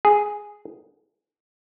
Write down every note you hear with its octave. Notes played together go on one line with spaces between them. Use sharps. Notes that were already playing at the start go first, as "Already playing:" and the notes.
G#4